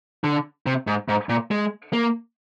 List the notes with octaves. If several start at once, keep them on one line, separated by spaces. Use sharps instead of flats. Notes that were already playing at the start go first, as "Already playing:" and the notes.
D3
C3
G#2
G#2
A#2
G#3
A#3